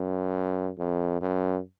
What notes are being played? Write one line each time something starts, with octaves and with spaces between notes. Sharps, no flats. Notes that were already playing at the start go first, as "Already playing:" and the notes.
Already playing: F#2
F2
F#2